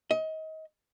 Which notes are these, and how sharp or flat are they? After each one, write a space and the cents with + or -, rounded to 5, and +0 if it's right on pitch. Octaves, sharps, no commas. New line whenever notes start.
D#5 +30